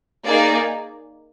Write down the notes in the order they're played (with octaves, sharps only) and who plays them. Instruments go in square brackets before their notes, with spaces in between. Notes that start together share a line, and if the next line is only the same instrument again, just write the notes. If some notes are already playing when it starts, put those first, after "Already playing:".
[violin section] A#3 D#4 G#4 D5